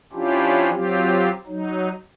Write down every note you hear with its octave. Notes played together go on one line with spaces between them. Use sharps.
F3 C#4 D4 E4 F4 G4
F#3 C4 F4 G4
F#3 D#4